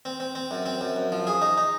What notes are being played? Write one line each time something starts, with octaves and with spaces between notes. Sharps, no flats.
C4
C4
C4
F#2
C4
F#2
F#2
F3
G#4
D#4
D#4